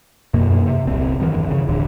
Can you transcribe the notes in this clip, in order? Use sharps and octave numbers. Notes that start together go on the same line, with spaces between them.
F#2 B2 A#3
C3
D#1 C2 C4
F1 G2 D#3 E3
C#3
D1 A1 D3